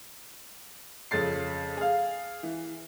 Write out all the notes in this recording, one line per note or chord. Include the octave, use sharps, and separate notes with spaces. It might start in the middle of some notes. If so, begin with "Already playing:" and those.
F2 C#3 A6 C7
G#4 F5
E3